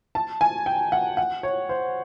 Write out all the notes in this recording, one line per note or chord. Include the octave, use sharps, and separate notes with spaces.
A5
G#5
G5
F#5
F#5
C#5
C5